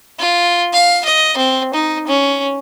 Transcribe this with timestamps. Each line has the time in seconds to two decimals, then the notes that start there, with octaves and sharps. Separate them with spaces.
0.19 F4
0.73 F5
1.05 D#5
1.37 C4
1.74 D#4
2.07 C#4